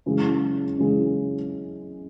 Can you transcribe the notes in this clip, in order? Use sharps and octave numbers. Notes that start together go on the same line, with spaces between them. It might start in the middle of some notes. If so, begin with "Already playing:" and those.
F#2 C#3 E3 G#3
F#2 C#3 E3 G#3